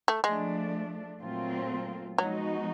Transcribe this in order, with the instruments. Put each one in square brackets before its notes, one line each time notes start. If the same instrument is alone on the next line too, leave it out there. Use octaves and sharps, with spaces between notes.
[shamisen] A3
[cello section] F3 A3 D4 [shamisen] G#3
[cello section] A#2 F#3 A3 C4 F4
[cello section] F3 G#3 B3 D#4 F#4 [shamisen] F#3